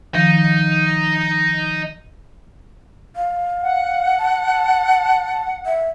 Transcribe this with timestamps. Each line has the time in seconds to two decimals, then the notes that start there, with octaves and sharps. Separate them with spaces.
0.15 D#3 F3 D#4
3.16 F5
3.61 F#5
4.18 A5
5.66 E5